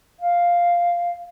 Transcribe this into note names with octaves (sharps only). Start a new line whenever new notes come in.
F5